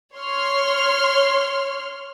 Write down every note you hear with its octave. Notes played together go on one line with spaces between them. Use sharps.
C#5 C6 F6